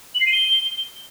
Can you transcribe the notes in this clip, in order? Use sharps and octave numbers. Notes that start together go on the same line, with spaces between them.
F#7
C7
D#7
G7